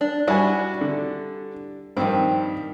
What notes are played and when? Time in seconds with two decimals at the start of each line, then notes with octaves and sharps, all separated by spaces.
0.01 D4
0.27 G3 D4 E4 F#4 E5 G#5
0.81 D3
1.97 G2 D#3 F3 C4